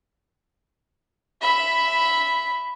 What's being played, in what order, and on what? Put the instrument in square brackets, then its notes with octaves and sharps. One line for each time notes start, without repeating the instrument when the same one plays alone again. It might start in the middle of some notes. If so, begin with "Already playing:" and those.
[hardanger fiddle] E5 B5